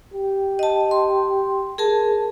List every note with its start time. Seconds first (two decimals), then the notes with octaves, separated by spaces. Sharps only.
0.14 G4
0.59 D#5 A5
0.91 C6
1.78 G#4 A#4 A5